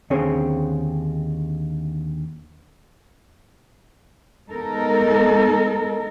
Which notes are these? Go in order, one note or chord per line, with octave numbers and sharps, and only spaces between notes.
D#2 D3 C4 C#4 G#4 C#5
G#3 B3 D#4 A4 A#4